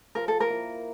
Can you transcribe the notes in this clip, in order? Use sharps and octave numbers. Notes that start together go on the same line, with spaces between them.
F3 A#4
A4
A#4
A#3 E4